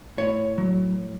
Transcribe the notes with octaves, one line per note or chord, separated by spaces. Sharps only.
A2 C#5
F#3